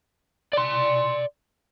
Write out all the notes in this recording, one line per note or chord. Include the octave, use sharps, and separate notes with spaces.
D5 C6